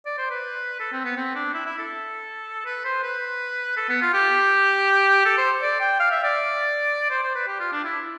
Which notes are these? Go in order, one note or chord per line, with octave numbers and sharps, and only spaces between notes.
D5
C5
B4
A4
C4
B3
C4
D4
E4
E4
A4
B4
C5
B4
A4
B3
F4
G4
A4
C5
D5
G5
F5
E5
D5
C5
C5
B4
G4
F4
D4
E4